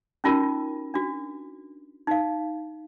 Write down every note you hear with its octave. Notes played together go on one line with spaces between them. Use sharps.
C#4 D#4 F4 F#4 A#4
D4 F#4
D#4 F5